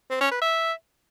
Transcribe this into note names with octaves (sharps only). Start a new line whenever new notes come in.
C4
C#4
B4
E5